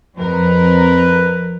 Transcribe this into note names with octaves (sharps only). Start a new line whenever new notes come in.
F2 A#4 B4